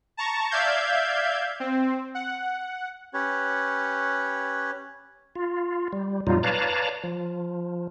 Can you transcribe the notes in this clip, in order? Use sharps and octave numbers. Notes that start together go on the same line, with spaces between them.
A5 A#5 C#6
D5 E5 F5 G6 G#6
C4
F#5
C#4 G4 B4 C#5
F4
G3
F2 A#2 F#3 G3 D#4 F4
B4 C#5 D5 F5 A5 A#5
F3